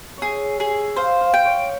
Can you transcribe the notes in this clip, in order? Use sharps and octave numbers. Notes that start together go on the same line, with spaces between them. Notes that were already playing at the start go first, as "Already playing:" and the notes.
G#4 C#5 E5
G#4 E5
C5 F5
F5
G5
C#5